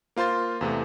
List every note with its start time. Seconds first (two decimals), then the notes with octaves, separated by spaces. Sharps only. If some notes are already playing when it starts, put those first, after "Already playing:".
0.16 A#3 F4 C5 C6 A6
0.61 E2 C3 A3